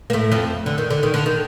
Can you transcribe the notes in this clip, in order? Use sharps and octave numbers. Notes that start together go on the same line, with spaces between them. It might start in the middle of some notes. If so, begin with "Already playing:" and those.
A#3
A2 A3
F2 F3
D3
D#3
D3
D#3
D3
D#3